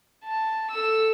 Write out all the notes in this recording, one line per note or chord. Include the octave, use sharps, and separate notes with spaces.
A5
A4 E6